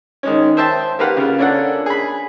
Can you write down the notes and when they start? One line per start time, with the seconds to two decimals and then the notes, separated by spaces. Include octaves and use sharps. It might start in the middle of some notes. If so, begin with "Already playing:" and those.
0.23 D#3 G#3 C#4
0.57 C5 E5 G5 A5 C6
0.99 A#3 G4 B4 F5 F#5
1.17 C#3 F4
1.39 A#3 C#4 D4 A4 F#5
1.86 G#4 B5